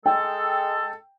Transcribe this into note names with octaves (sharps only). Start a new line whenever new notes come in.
G#3 A4 G5